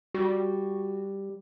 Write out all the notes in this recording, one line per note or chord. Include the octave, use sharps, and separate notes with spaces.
G3 F#4